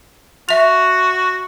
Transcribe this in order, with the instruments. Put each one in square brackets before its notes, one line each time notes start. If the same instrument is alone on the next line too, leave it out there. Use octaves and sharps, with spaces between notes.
[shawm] F#4 [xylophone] E5 F7